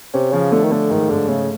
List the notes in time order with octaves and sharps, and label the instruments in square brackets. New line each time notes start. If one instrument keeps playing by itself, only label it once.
[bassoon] C3 [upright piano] C#4
[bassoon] C#3 [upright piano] F3
[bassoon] D3 [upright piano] A3
[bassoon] D#3
[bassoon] D3 [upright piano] A3
[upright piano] G#2 [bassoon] D#3
[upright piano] G#2 [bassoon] D3
[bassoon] C#3 [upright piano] A3